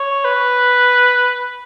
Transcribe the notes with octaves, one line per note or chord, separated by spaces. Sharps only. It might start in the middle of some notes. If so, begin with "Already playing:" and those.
Already playing: C#5
B4